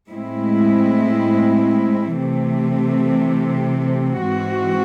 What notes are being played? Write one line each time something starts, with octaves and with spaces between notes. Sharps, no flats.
A2 G#3 C4 E4
C3 E3 A3 C4
G#2 E3 C4 F#4